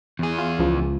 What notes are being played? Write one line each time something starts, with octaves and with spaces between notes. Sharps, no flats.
E2 G#4
F4
C#2 F3